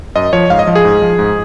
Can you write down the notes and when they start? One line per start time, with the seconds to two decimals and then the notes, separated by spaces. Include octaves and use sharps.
0.15 F#2 D#5
0.33 F3 C#5
0.50 G#2 F5
0.59 D#5
0.67 F3
0.75 G#4
0.85 G#2
1.02 F3
1.19 G#2